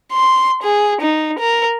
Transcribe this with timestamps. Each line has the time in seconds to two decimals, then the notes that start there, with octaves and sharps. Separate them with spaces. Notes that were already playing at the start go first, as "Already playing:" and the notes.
0.13 C6
0.63 G#4
1.01 D#4
1.39 A#4